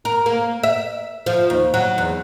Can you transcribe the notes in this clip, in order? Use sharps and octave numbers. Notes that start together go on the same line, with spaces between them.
A#4
A#3
E5
F3
D#2
F#3
E2